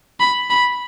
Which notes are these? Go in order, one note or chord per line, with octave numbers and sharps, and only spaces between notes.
B5
B5